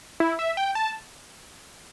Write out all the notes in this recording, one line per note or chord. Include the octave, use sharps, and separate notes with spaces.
E4
E5
G5
A5